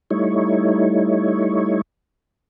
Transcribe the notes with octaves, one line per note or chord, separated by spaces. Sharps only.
G3 A3 D#4 E4 C#5